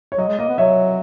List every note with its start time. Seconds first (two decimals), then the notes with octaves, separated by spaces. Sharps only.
0.12 C#5
0.18 F#3 D#5
0.28 G#3
0.38 A#3 D#5
0.48 B3
0.58 F#3 C#5 E5